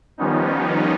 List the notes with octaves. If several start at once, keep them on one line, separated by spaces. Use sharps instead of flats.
D#3 F3 G3 B3 C#4 D#4